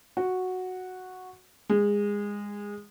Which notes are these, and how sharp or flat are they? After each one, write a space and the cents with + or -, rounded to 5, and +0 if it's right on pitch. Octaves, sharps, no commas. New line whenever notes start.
F#4 -5
G#3 -20